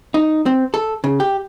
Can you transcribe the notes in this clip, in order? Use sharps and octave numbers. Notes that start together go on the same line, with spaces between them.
D#4
C4
A4
C#3
G4